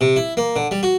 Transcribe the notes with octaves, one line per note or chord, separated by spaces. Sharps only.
C3
E4
A#3
D3
G3
F#4